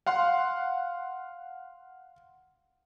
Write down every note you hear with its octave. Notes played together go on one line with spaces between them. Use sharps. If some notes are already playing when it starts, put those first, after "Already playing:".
F5 F#5 C6